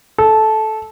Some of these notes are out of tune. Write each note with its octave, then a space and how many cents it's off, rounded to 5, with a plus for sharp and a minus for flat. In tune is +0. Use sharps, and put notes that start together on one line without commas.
A4 -15